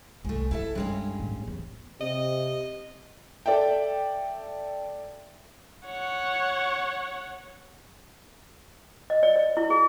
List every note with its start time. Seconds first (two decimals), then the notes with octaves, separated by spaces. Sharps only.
0.25 C2 G#3 A3
0.51 C3 E4 A4 E5
0.75 G2 D3 G#3 C#4
1.19 A2 E3
1.47 E2
2.01 C3 D#5
3.46 A4 D5 E5 G5
5.86 C#5 F#5
9.10 D#5
9.23 D5
9.36 D5
9.57 E4
9.70 G#4